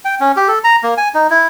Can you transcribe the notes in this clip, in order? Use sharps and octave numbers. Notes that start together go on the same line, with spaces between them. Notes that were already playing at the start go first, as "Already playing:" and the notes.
G5
C#4
G4
A4
A#5
A#3
G#5
D#4
E4